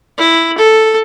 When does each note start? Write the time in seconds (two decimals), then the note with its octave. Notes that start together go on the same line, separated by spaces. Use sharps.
0.18 E4
0.58 A4